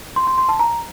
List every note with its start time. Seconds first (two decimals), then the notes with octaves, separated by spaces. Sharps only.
0.16 C6
0.27 C6
0.38 C6
0.49 A5
0.59 A#5